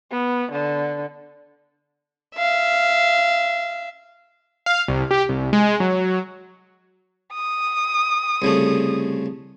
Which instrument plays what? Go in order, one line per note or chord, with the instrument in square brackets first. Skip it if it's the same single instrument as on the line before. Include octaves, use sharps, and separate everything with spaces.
[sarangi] B3
D3
[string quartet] E5 F5
[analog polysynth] F5
C2
G4
C2
G#3
F#3
[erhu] D#6
[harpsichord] C2 C#3 A3